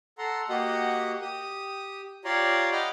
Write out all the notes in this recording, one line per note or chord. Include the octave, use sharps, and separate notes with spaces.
A4 F#5 A#5 C6
A#3 F#4 G4 D#5 F#5
G4 D#6
F4 G4 C#5 D5 A#5 C6
D#5 F#5 G5 B5 D6 F6